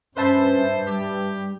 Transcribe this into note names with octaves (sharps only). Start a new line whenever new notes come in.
G2 C#4 B4 C5 E5 A5
G3 G4